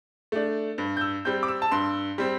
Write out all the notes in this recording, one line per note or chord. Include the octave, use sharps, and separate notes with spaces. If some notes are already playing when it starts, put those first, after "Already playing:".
A3 D4
G2
G6
E6
G3 C4 G6
D6
E6
A5
G2 C6
G3 C4